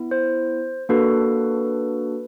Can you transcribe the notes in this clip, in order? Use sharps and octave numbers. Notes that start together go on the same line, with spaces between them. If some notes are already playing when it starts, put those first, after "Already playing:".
Already playing: B3 E4
C5
A#3 D4 F#4 A4 B4